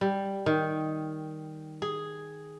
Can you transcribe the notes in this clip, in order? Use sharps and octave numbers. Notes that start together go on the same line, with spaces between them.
G3
D#3
G#4